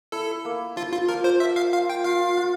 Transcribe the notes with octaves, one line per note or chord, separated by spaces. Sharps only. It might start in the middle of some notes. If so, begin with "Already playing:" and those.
E4 A4
A#3
F3 F4
F4
F3 A#4
C5
F4 E5
F5
F4 F5
G5
F4 F5
F4